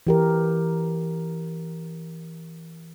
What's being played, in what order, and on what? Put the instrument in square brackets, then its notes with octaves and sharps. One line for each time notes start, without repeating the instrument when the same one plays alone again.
[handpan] E3 G4 A#4